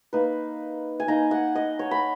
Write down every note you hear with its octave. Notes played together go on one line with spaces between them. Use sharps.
A#3 D#4 B4
G#5
A#3 D#4 A#5
F#5
D#5
C#5
B5